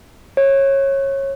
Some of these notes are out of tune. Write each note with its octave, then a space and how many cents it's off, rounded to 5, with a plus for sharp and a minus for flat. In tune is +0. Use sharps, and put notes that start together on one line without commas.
C#5 -20